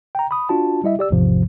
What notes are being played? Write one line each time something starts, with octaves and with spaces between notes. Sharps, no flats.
G5 A#5
B5 D#6
D4 F4 F#4 A5
G3 E4 D#5 E5
G4 D5 E6
A1 E2 G#2 C3 F3